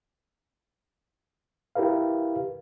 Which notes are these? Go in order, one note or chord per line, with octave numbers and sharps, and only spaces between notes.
E4 G4 A#4 B4 F5